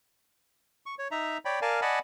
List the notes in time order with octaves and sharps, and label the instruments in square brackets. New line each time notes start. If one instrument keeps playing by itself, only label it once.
[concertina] C#6
C#5
D#4 E5 A#5
C#5 D5 G5 B5
A#4 D5 F5 G#5 A5
D5 D#5 F#5 G#5 A5 B5